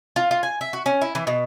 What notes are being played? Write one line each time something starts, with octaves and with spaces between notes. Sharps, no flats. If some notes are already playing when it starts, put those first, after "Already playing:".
F4
F4
G#5
E5
F#4
C#4
E4
E3
B2